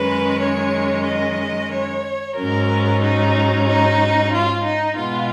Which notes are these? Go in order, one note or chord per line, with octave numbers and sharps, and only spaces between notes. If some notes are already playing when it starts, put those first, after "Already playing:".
Already playing: F#2 D#3 G#3 C#4 B4
C#5
D#5
C#5
G#2 F#3 C#4 A#4
D#4
D#4
F4
D#4
B2 G#3 B3 F4